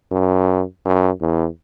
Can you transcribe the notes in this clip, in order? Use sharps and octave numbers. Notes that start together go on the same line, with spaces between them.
F#2
F#2
E2